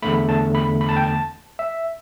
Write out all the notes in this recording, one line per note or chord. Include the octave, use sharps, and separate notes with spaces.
E2 D3 A3 B5
A5
B5
B5
A5
G5
A5
E5